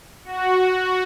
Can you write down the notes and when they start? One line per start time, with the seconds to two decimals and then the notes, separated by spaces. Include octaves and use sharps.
0.24 F#4